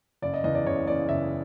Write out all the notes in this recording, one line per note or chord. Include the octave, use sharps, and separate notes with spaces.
F#1 D5
D#5
E2 C#3 D#5
D5
F#1 C#5
E2 C#3 D5
F#1 E5